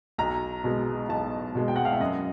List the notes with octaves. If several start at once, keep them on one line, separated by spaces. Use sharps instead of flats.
B1 A#5
B2 G#3
B1 A5
B2 G#3
G5
F#5
F5
E5
F#2 D#5